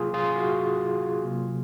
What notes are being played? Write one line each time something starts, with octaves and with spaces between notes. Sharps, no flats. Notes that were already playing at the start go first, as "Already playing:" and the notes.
Already playing: C3 F#3 A#3 F4 G#4
F4 G#4
F#4
C3 F#3 A#3